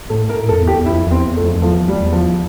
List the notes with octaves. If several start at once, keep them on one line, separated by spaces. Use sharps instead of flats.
A2 A4
A#4
A2
F2 A4
E2
G4
E2
F2 E4
F2
E2 C4
E2
F2 A3
F2
E2 F3
G3
E2
F3